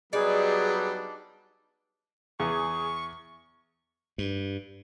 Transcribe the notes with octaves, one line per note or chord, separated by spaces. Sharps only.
F#3 G3 B3 D4 D#4 G#4 D5
E2 G#4 C#6
G2